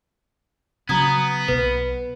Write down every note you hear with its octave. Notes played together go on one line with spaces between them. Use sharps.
C#3 F#3 B3 A#5 D#6 G#6
B1 B2 B4